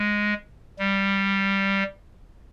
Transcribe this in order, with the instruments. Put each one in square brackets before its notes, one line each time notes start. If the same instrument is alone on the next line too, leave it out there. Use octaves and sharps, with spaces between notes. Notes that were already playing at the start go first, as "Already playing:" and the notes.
Already playing: [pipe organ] G#3
G3